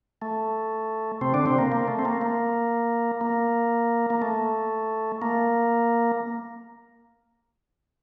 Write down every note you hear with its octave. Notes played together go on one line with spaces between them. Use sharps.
A3
C3 C4
D3 D4
C3 C4
A#3
A#3
A3
C4
A#3
A#3
A#3
A#3
A3
A#3